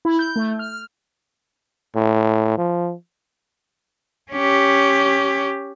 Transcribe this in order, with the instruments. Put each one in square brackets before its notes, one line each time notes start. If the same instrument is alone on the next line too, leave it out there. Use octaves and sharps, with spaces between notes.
[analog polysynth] E4
G6
A3
F6
[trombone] A2
F3
[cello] C#4 G4